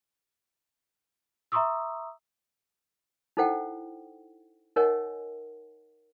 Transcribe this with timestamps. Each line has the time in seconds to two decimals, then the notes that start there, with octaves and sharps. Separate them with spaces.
1.52 E5 A#5 C6 C#6 D#6 E6
3.37 D#4 E4 A4 C5 F#5 G5
4.76 D#4 A#4 C#5 D#5 F#5 G#5